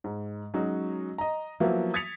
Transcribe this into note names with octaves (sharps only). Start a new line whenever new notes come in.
G#2
F#3 G#3 C#4 D#4 F#4
D#5 A#5
F3 F#3 A#3 B3 E4 F#4
D#6 G#6 A6 B6 C#7 F7